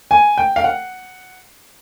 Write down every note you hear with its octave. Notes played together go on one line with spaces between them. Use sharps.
G#5
G5
F5
F#5